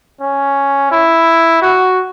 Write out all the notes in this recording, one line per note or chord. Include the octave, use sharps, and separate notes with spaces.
C#4
E4
F#4